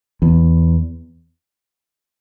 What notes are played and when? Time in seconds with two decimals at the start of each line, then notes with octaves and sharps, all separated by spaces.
0.22 E2